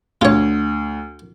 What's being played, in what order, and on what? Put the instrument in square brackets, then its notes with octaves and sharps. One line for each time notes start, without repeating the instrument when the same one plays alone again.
[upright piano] D2 [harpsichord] F4 C#5